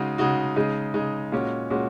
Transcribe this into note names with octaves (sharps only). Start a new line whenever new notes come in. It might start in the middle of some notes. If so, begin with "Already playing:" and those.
Already playing: C#3 G#3 D#4 F#4
C#3 G#3 D#4 F#4
C#3 G#3 D#4
C#3 G#3 D#4
A#2 G#3 C#4 F#4
A#2 G#3 C#4 F#4